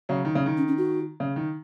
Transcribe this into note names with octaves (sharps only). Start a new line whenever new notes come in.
C#3 F#3
D#3
C#3
D#3
C#4
C#4
F#4
C#3
D#3